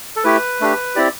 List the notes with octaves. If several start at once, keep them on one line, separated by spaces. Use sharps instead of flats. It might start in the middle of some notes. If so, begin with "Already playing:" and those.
A4
A3 E4 G4 B4
A3 D4 G4
C4 E4 G4 D5